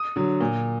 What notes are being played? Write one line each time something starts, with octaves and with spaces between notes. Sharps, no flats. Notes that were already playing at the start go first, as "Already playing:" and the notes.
Already playing: D#6
D3 F#3
A#2